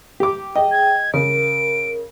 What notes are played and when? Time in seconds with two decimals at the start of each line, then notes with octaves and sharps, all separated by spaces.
0.20 G4 D6
0.56 G#4 D#5 G5
0.72 G#6
1.14 C#3 A#4 D7